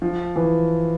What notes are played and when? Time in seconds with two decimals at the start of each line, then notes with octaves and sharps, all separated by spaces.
0.02 F3
0.36 E3